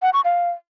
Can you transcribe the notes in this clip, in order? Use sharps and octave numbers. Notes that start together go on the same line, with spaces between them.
F#5
C#6
F5